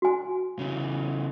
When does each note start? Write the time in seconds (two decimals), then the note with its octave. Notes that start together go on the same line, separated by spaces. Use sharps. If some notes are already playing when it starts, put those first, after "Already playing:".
0.02 F#4 G#5
0.59 C#3 E3